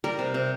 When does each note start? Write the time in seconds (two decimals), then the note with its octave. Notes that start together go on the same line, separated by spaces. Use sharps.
0.04 G3 A#4
0.19 C3
0.34 C3